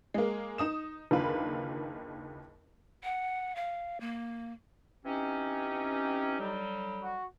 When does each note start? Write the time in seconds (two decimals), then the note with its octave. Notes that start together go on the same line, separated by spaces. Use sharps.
0.14 G#3 A#3
0.58 D#4 D#6 E7
1.11 F#1 D#2 D3 F4 B4
3.03 F#5
3.56 F5
4.01 A#3
5.06 E3 C4 C#4 D#4 G4
6.40 D3 F#3 G3
7.02 F#4